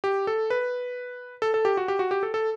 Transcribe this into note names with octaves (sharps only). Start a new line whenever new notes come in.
G4
A4
B4
A4
A4
G4
F#4
G4
F#4
G4
A4
A4